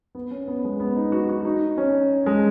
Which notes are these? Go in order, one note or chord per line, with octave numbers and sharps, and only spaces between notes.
B3
C#4
B3
G#3
B3
D#4
F#4
F#4
D#4
C#4
G#3